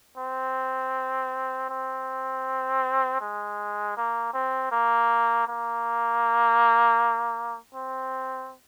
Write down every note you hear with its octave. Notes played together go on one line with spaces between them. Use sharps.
C4
C4
G#3
A#3
C4
A#3
A#3
C4